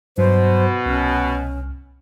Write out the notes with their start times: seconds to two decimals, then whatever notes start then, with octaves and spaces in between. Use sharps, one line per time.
0.18 G2 B2 F#3 C5
0.86 C2 C#4 F6